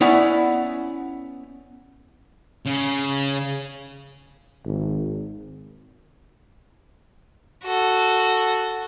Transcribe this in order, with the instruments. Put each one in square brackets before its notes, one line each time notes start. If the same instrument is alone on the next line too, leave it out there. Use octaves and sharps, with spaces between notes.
[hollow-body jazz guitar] B3 C#4 E4 D5 D#5
[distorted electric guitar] C#3
[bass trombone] G#1
[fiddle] F#4 A4